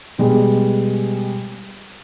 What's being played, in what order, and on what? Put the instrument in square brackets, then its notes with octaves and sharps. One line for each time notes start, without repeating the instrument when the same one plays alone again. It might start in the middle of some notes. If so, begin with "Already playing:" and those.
[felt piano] B2 G3 G#3